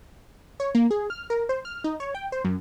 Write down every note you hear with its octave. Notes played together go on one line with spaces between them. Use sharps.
C#5
A#3
G#4
F6
A#4
C5
F6
D#4
C#5
G5
C5
F#2